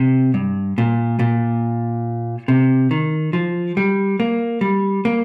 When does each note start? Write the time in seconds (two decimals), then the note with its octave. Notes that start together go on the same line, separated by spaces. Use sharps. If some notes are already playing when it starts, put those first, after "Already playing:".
Already playing: C3
0.34 G2
0.78 A#2
1.19 A#2
2.48 C3
2.91 D#3
3.33 F3
3.77 G3
4.20 A#3
4.61 G3
5.05 A#3